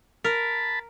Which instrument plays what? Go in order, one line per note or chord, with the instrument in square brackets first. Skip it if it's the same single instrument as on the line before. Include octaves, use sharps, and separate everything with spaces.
[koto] A#4 [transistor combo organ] A5 B5